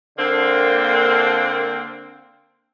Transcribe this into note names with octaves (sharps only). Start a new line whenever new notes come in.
D3 A#3 C4